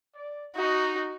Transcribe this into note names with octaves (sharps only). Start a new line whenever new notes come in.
D5
D#4 F#4